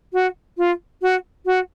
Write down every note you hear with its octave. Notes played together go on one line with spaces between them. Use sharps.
F#4
F4
F#4
F#4